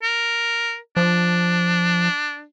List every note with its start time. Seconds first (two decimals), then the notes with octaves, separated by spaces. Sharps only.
0.03 A#4
0.97 F3 D4